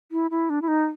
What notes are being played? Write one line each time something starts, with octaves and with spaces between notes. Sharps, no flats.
E4
E4
D4
E4
D#4